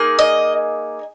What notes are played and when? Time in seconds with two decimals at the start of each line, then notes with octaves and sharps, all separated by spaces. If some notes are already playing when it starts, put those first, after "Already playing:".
Already playing: A#3 D#4 G#4
0.19 D#5